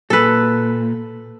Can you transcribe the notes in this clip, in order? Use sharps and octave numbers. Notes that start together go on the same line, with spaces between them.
A#2 A4 B4